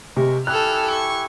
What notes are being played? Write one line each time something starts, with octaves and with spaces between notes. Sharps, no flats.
C3 G#3 A#4 C#6
E4 G4 A4 G#5 F6 F#6
C#6